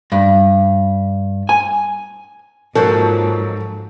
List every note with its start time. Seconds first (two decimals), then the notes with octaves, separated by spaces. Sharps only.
0.12 G2
1.49 G#5
2.75 G#2 F3 F#3 A#3 A4